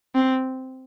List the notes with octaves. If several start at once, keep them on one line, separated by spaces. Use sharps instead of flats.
C4